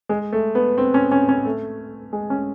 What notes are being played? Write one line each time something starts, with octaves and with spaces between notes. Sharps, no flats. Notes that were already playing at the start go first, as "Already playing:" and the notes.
G#3
A3
B3
C4
C#4
C#4
C#4
A3
G#3
C#4